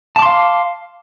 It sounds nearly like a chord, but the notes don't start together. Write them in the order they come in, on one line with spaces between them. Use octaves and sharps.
A5 D6 C6 F5